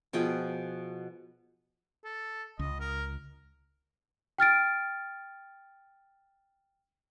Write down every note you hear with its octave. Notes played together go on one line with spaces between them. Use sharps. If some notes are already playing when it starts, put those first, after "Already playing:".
B2 F3 G#4 G5
A4
C#2 D#5
A#4
G5 F6 A6 D7